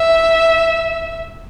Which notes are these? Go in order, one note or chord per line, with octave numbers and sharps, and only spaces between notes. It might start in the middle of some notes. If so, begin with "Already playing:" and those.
Already playing: E5